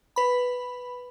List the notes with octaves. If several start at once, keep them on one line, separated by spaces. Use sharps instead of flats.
B4 B5